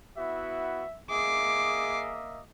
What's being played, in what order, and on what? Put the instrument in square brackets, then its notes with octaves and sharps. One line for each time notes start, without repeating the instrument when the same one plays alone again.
[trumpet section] B3 E4 F#4 [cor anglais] E5
[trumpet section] A#3 D#5 E5 [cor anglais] G#4 [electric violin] D6 C7